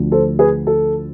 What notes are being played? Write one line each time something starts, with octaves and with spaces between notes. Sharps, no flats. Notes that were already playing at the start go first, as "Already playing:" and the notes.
Already playing: D2 D3 F3
A4 C5
G#4 B4
A4